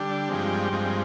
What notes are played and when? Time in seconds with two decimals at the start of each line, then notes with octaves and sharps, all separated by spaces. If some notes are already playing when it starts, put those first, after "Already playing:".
Already playing: D3 G3 D4 G4
0.29 G2 F3 G#3 C4
0.72 G2 F3 G#3 C4